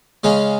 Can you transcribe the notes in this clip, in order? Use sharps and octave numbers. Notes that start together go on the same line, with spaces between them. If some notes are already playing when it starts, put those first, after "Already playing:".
C#3 G#3 C#4 F5